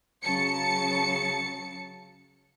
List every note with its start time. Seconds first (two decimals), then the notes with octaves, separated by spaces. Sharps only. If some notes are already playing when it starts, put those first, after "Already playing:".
0.23 C#3 F#3 A5 C#7